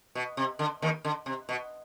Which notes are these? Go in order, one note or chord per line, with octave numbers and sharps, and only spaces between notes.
B2
C3
D3
D#2 D#3
D3
C3
B2